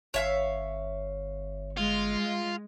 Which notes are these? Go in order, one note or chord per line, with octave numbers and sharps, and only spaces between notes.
G1 C#5 E5 F5
G#3 F4